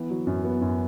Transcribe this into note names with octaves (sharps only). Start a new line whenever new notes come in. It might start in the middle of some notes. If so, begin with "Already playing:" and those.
Already playing: E3 B3
F#3
F#2
B3
F#2